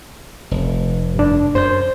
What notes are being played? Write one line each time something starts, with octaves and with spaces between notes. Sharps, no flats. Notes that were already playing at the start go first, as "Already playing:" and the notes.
F1
G2 D4
F#2 C5 G6